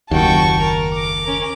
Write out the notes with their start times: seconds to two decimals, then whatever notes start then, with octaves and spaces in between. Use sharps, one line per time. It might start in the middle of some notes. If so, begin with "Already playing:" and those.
0.11 F#1 D#2 F#4 G5 A5 C#6
0.60 A#4
0.94 D6
1.24 C#4 A#4